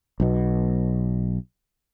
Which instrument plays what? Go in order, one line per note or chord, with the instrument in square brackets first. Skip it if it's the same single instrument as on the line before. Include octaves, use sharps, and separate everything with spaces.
[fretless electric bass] B1 B2